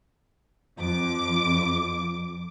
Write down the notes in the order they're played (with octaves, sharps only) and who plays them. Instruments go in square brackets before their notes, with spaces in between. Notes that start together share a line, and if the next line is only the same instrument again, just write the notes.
[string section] F2 D6